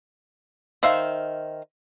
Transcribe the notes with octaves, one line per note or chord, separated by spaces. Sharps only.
D#3 C5 E5 F5